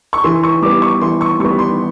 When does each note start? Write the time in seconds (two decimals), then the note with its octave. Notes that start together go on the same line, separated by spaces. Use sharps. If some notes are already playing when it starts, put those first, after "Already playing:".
0.13 C#6
0.24 E3 C6
0.44 C#6
0.62 G3 B3 D6
0.82 C#6
1.01 E3 C6
1.21 C#6
1.40 G3 B3 C#6
1.59 C6